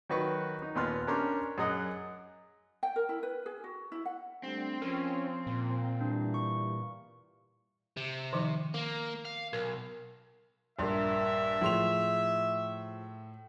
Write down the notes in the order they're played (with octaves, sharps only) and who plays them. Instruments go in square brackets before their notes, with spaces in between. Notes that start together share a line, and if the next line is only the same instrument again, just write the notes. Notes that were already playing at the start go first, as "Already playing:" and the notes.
[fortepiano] D#3 F#3 F#4 B4 C#6
D#4
D#2 A#2 B3 C6 F6
C#4 D4 G4 A#4 A#5 C6
F#2 G#4 D#5 F#5
[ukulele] G5
A#4
E4
B4
G#4
F#4
E4
F#5
[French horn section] G3 A3 D4 [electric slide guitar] C4
[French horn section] F3 [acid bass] C#4 [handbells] A#4
[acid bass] A#2
[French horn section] E3 G3 [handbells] D4
[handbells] C#6
[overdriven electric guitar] C3
[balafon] D#3 F3 D#4
[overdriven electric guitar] A#3
F5
[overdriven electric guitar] B1 [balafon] A#4
[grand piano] A#1 G2 [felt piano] A#4 C6 [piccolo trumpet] E5
[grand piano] A2 C6 F7 [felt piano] F3 G#4